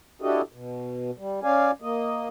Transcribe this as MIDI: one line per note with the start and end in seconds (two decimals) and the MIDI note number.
0.22 0.41 62
0.22 0.41 64
0.22 0.41 66
0.22 0.41 67
0.22 0.41 69
0.22 0.41 75
0.52 1.11 47
1.18 1.40 55
1.43 1.71 61
1.43 1.71 74
1.43 1.71 77
1.43 1.71 80
1.82 2.28 58
1.82 2.28 75